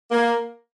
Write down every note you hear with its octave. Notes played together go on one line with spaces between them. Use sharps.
A#3